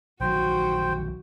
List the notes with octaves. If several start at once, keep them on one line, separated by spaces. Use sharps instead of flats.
A#1 D#3 F#3 F#4 C5 G5